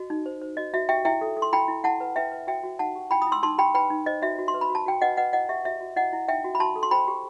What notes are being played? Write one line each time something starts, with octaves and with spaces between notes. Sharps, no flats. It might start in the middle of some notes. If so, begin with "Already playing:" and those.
Already playing: F#4 D#5
D#4
C5
C5
F#4 D#5
F#4 E5
G4 E5 G5
E4 E5 G5
A4
A4
C6
E4 G5 B5
E4
E4 F#5 A5
B4
B4 E5 G5
B4
F#4 E5 G5
F#4
D#4 F#5 A5
G4
E4 G5 B5
B5 D#6
E4
C6 E6
D#4 A5 C6
G4 G5 B5
B4 G5 B5
D#4
C5 D#5
F#4 E5
F#4
C6
B4
B5
F#4
A5
F#4 G5
B4 D#5 F#5
B4 D#5 F#5
E4 D#5 F#5
G4 E5
F#4 E5
F#4
E4 D#5 F#5
E4
D#4 E5 G5
F#4
B5
F#4 A5 C6
A4
C6
C5 G5 B5
G4